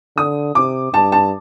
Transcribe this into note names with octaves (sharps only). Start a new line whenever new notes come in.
D3 D#6
C3 D6
G2 A5
A5